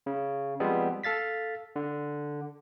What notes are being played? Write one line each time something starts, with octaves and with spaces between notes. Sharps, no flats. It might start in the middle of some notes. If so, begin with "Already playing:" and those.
C#3
F3 G3 G#3 B3 C4
A4 F5 A6 B6
D3